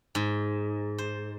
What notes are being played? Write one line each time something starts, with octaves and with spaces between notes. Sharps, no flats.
G#2
C5